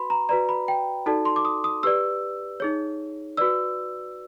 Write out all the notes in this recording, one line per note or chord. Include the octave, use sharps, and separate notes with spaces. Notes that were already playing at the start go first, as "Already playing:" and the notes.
Already playing: F#4 B4 B5 C6
A#5
F#4 B4 D5 A#5
B5
G5
D#4 F#4 A4 D5 A5
C6
D6
D#6
D#6
G4 B4 D5 E6
D#4 G#4 C#5
F#4 B4 D5 E6